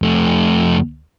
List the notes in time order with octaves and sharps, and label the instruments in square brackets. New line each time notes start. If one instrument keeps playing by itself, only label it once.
[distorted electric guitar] F2 A3